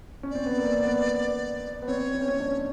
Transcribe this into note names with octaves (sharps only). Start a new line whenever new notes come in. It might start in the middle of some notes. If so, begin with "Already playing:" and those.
C#4
C4 D5
B3
A#3
B3
B3
C4 C#5
C4
C#4
C4
D4